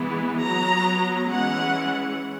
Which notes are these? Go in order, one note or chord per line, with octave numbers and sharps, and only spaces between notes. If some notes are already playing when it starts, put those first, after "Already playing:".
Already playing: E3 G#3 B3
F#3 B3 A#5
E3 G#3 C#4 F#5